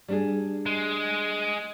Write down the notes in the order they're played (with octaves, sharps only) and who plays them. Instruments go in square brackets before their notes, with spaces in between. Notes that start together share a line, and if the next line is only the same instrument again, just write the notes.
[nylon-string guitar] G3 D4 G#4
[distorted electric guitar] G#3